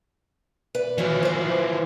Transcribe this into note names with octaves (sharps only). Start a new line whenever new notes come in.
B4 D5
E3 F3 F#4 C#5
B4 C5